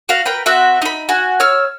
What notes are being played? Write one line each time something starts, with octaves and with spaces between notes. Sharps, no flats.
F#4 F5
A#4 B4 G5 B5
C4 F#4 E5
D#4 B5
F#4 G#5
C#5 E6 F6